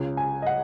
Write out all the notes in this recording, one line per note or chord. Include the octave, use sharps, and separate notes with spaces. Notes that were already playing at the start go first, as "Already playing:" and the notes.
Already playing: C#2 C#3
G#5
D#5
F#5